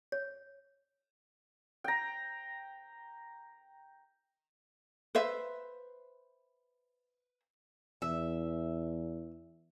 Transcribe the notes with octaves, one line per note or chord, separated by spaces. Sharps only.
C#5
G5 A#5
B4 C5 E5
E2 E5